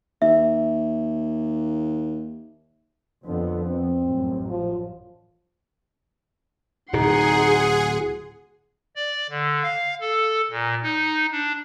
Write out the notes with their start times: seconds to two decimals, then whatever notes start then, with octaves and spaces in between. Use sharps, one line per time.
0.22 D#2 E5
3.26 F2 D3 B3
3.65 C4
3.98 A1 F#2
4.49 F3
6.93 D1 C3 D#4 G#4 F#5 C6
8.96 D5
9.30 D3
9.63 F5
10.01 A4
10.50 A#2
10.83 D#4
11.32 D4